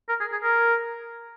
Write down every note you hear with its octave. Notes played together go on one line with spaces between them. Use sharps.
A#4
G#4
G#4
A#4